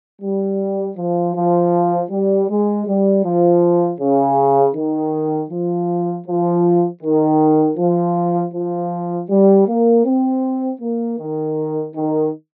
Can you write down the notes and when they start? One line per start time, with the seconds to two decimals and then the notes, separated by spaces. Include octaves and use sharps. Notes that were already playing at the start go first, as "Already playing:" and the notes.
0.22 G3
0.97 F3
1.35 F3
2.10 G3
2.49 G#3
2.87 G3
3.25 F3
4.00 C#3
4.76 D#3
5.51 F3
6.27 F3
7.03 D#3
7.78 F3
8.54 F3
9.30 G3
9.67 A#3
10.06 C4
10.81 A#3
11.19 D#3
11.95 D#3